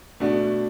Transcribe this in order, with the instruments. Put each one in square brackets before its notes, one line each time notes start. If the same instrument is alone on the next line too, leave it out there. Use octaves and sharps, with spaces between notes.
[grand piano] B2 A3 D4 F#4